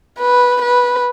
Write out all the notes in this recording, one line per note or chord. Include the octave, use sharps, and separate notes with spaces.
B4
B4